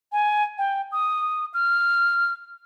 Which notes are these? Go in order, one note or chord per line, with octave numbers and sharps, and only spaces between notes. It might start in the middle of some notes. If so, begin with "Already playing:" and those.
G#5
G5
D#6
F6